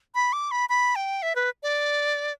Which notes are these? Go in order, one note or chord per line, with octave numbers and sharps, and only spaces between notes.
B5
D6
B5
B5
G5
E5
B4
D5